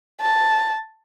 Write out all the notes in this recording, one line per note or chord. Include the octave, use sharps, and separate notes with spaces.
A5